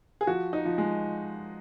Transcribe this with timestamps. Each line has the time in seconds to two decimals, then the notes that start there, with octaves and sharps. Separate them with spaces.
0.21 G#4
0.27 F3 F#4
0.53 D#4
0.65 F3
0.78 G#3